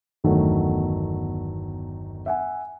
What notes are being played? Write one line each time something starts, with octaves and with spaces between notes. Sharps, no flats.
G1 E2 D#3 F#3 A3
E5 F#5 G#5